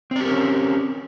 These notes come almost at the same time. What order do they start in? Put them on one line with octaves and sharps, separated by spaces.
C4 D5 G4 A#4 C#4